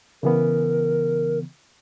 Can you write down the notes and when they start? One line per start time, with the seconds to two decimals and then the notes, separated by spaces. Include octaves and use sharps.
0.23 C#3 E3 B3 A#4